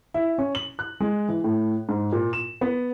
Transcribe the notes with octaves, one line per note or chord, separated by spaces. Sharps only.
E4
C#4
F#7
F#6
G#3
E3
A2
G#2
A#2
E7
B3